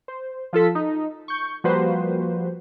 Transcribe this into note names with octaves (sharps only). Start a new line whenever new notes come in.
C5
F3 F4 A4 B6
D#4
C#6 G6
F3 G3 A#3 F#4 B4 C5